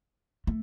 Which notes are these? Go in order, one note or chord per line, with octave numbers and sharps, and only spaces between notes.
A3